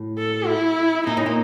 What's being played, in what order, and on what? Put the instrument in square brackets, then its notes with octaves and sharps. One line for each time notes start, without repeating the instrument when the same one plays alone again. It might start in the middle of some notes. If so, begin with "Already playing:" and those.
Already playing: [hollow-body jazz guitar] A2
[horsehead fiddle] A4
E4
[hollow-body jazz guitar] A#2 [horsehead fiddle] D#4
[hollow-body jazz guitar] A2
A#2